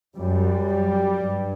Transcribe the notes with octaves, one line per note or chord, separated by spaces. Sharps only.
F#2 G3
G2